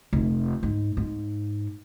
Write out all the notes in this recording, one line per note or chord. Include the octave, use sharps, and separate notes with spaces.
F1
G#2
G#2